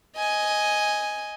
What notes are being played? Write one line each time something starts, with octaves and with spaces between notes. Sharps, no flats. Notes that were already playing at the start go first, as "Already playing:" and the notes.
D#5 G#5